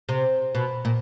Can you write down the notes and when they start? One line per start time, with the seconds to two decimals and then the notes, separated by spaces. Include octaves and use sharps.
0.09 C3
0.55 B2
0.85 A#2